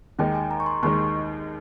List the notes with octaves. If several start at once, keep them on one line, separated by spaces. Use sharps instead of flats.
D#2 D#3 G#3 D#4 G5
G#5
A#5
C#6
C6
D#2 D#3 G#3 D#4 C#6